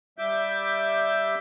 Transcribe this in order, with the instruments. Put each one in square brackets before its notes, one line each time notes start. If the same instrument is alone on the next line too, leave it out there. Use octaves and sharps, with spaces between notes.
[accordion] G3 E5 D6 G6